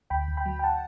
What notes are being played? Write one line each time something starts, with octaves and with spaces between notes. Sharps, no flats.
D2 G5 B5
D2
G5 B5
F#3
G5
F#5 A5